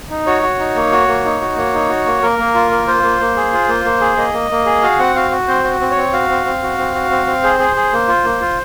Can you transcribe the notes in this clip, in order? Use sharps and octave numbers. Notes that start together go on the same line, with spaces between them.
D#4
F#4 C#5
F#4
D#4
A#3
F#4
A#3
D#4
F#4
A#3 C#5
D#4
F#4
A#3
A#3 A#4
A#3
F4
A#3
F4 C5
A#3
A#3
G#4
F4
A#3
A#3
G#4
A#3 D#5
A#3
A#3
G#4
F#4 F5
C4 F#5
F#4 F5
F#4
C4 C5
F#4
C4
C#5
C4
F#4 F5
C4
C4
F#4
C4
F#4
C4
C4
G#4 C5
G#4
G#4
A#3
F4
A#3
F4